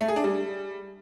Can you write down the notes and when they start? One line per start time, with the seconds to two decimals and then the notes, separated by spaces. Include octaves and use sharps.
0.01 A3
0.08 G#4
0.16 D4
0.24 G3